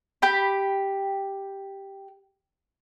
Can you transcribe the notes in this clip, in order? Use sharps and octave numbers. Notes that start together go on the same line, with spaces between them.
G4 G5 B5